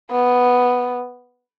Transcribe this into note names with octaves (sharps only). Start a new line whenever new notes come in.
B3